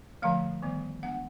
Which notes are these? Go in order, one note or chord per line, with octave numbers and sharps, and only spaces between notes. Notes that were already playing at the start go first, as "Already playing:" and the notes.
D3 F3 A3 F5
D#3 G3 B3
G#3 B3 D4 F#5